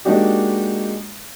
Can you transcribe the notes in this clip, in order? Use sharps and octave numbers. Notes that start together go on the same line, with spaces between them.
G#3 A#3 D4 D#4 F#4 G4